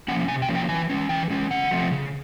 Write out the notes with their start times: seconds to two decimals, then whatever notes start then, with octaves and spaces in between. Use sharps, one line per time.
0.08 F3 A#3 C#4 F#5
0.28 C3 G#5
0.42 G5
0.48 F3 A#3 C#4
0.56 G5
0.69 E3 G#5
0.89 G#3 C#4
1.09 E3 G5
1.30 G#3 C#4
1.51 C#3 F#5
1.71 F3 A3 C4
1.92 C#3